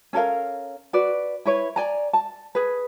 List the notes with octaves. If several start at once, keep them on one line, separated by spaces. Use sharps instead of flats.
C#4 A4 A#4 F5
F#4 B4 D5
E4 B4 C#5
D5 G#5 A#5
A5
G#4 B4